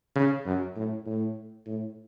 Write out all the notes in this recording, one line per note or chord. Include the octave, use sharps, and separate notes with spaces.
C#3
F#2
A2
A2
A2